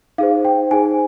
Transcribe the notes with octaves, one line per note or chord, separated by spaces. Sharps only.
D#4 G#4 C5 F5
G5
D#4 G#4 C5 G#5